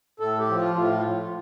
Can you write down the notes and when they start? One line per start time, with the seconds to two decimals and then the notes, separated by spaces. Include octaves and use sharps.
0.20 A2 A4
0.39 G4
0.49 F3
0.58 F4
0.76 A2 F4